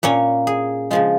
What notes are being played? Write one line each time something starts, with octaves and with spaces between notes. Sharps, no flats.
A#2 A#3 C#4 C#5
G#4
C#3 F3 G#3 F4